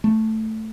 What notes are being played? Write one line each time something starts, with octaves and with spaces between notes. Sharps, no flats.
A3